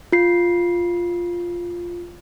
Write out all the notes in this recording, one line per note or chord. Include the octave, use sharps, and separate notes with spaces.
F4 C7